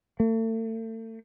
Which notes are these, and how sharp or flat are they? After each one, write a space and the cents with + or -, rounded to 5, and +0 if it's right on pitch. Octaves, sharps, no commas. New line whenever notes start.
A3 +35